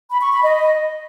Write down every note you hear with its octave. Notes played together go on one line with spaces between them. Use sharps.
B5
C#6
B5
D#5